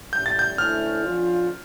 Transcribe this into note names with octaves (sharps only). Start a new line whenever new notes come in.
A2 G3 C#4 G6
A6
G6
D2 D3 A3 C#4 E4 F6
D3 F3 C#4 F4